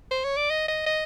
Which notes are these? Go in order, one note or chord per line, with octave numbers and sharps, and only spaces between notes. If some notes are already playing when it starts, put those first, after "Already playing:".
C5
C#5
D5
D#5
D#5
D#5